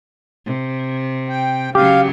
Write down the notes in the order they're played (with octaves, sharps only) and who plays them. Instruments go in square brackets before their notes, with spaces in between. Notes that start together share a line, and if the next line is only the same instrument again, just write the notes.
[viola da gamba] C3
[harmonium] G5
[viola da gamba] C#3 F#3 [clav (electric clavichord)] G4 [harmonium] F5